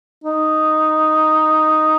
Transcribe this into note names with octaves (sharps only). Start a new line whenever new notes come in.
D#4